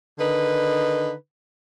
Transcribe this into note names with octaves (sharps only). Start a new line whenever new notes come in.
D3 D#3 D#4 B4